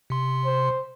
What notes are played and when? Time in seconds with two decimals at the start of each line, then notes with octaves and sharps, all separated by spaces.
0.10 C3 C6
0.45 C5